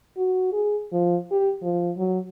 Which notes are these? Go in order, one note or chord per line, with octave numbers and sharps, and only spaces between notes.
F#4
G#4
F3
G4
F3
F#3